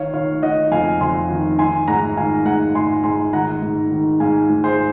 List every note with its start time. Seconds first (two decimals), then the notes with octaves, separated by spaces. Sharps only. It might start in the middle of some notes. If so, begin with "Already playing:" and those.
Already playing: D#3 C#5 F5
0.14 D#3 C#5 F5
0.42 D#3 D#5 F#5
0.72 F2 F5 G#5
1.00 F2 G#5 C6
1.30 D#3
1.58 D#3 G#5 C6
1.88 G#2 F#5 A#5
2.17 D#3 F5 G#5
2.46 G#2 F#5 A#5
2.75 G#2 G#5 C6
3.03 G#2 G#5 C6
3.33 D#3 F#5 A#5
3.62 G#2
3.91 D#3
4.20 G#2 F5 G#5
4.49 G#2
4.64 G#4 C5